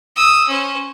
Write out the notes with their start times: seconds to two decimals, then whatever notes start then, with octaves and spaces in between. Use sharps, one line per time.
0.16 D#6 E6
0.48 C#4 C5